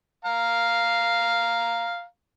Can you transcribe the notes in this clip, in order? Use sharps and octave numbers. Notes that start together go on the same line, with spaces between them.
F5 A#5